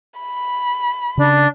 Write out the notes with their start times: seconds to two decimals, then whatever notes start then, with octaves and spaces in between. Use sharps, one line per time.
0.20 B5
1.18 C#3 D4